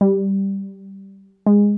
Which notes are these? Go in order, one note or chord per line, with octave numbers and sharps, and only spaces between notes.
G3
G#3